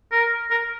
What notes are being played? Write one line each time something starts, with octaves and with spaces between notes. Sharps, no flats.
A#4
A#4